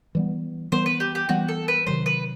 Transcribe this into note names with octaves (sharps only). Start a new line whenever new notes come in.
E3 G3 B3
E3 G3 B3 C5
B4
G4
G4
E3 G3 B3 F#4
A4
B4
C3 D#3 F#3 C5
B4